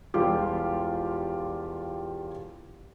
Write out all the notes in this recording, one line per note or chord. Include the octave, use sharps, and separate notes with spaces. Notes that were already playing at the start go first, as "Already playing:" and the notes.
E1 G3 F4 G4